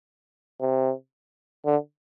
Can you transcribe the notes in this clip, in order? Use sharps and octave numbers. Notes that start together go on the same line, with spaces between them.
C3
D3